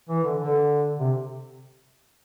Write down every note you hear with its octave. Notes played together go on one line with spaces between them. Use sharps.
E3
D3
D3
C3